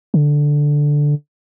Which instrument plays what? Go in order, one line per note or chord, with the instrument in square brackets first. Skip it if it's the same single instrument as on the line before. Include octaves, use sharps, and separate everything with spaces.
[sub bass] D3